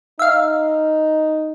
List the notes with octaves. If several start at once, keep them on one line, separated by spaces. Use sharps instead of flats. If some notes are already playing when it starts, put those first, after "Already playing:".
D#4 E5 F5